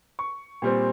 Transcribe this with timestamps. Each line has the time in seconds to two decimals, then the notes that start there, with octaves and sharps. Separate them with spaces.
0.19 C#6
0.62 A#2 G3 C4